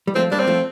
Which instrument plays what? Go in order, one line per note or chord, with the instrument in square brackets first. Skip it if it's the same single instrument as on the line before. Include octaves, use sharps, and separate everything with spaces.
[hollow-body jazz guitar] G3
[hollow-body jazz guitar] F3 A3 [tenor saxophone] C4
[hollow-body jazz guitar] G3 A#3 [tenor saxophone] D4
[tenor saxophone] C4
[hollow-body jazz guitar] F3 A3